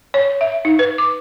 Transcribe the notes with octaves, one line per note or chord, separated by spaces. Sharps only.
C#5
E5
D#4
B4
D6